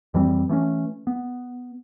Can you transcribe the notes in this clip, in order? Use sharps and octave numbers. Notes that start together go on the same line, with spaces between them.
F2 E3 G3 C4
E3 A3 B3 C#4
B3